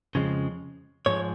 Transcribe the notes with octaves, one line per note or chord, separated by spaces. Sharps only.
F2 C#3 F3 G#3
G#2 F3 G#3 C#5